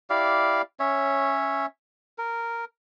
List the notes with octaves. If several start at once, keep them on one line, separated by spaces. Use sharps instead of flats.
E4 G4 D5 F5
C#4 C#5 E5
A#4